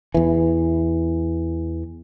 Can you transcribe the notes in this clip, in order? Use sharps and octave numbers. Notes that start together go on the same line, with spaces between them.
E2 E3